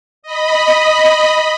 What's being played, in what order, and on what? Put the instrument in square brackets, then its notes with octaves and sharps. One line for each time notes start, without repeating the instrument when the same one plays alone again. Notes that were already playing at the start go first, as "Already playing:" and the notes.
[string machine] D#5 B5